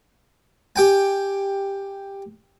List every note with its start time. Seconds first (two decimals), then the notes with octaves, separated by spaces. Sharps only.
0.76 G4 G5 G#5